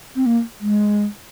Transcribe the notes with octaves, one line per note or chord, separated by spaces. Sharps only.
C4
A#3
G#3